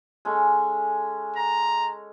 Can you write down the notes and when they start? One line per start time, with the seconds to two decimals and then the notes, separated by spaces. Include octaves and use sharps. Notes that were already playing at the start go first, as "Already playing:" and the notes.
0.25 G#3 C#4 A4
1.36 A#5